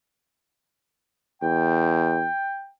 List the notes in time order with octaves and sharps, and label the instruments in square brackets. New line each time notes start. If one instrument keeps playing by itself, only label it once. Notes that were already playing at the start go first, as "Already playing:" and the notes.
[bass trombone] E2 [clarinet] G5